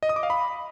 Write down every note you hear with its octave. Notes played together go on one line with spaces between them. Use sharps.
D#5
D#6
D6
F5
B5